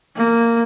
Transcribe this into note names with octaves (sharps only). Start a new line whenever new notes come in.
A#3